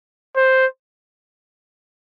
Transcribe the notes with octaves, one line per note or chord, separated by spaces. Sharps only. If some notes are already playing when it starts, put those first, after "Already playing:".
C5